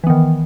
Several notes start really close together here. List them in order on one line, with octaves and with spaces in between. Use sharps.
E3 B3 D#3